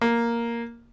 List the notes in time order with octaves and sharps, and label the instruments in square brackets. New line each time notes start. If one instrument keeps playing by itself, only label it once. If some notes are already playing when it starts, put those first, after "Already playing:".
[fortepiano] A#3